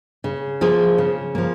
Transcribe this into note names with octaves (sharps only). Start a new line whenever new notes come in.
C#3
F3 A#3 F4 G#4
C#3
F3 A#3